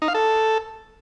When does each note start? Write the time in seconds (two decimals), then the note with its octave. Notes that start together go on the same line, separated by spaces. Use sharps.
0.02 D#4
0.08 F5
0.14 A4